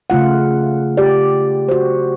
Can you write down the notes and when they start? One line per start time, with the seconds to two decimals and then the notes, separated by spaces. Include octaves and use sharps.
0.10 C#3 A3 F4 F#5
0.97 G4 D5
1.68 F#4 C5